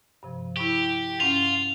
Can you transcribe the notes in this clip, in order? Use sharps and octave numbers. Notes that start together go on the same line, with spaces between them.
G2 C3 F3
E4 G4 B5 C#6
G2 C#4 F4 F#5 F7